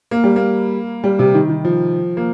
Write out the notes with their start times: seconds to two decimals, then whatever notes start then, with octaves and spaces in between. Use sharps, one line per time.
0.11 A#3
0.24 G3
0.36 A#3
1.04 G3
1.19 C3
1.34 D#3
1.49 D#3
1.65 F3
2.17 A#3